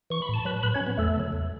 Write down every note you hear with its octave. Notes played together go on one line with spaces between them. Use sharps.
E3 C#6
B5
A2 A5
F#3 B4 B5
A2 B4 B5
C#4 C#5
F#3
B3 B4
E2 A3 A4
C#3 F#3
E2